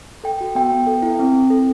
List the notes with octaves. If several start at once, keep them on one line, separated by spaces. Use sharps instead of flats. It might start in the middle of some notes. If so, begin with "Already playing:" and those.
A4 G5
F#4
B3 G5
B3
A4
E4
C4
C4
A4